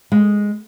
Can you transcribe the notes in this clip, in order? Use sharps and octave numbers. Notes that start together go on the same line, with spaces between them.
G#3